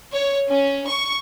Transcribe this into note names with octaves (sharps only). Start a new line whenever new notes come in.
C#5
C#4
C#6